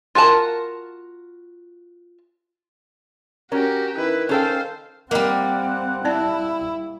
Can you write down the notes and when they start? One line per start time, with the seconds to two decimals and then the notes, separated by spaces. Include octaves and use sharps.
0.15 F4 F#4 A#4 A5
3.52 C#4 F#4 G4 A#4
3.97 D#3 E4 B4
4.29 C#4 A4 C5 F5 G5
5.11 G3 A#3 C4 A#4 D#5 F#5
6.05 C4 E4 D5 A5